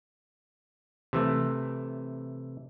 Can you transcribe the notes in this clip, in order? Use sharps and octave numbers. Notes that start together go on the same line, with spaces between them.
C3 E3 A3